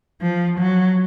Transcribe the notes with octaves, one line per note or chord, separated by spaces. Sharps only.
F3
F#3